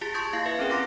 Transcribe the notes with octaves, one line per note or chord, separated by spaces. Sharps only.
F4 G4 G#4 A5 A6 B6
A5 C6 C#6 D#6 G6 G#6
A#3 E4 F5 A#6 C7
B4 E5
C4 C#4 G#4 A#4 G5
C4 C#4 F4 C6 D6 A#6